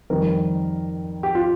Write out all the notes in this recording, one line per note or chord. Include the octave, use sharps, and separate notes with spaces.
F2 D#3 G3 A#4
G4
F4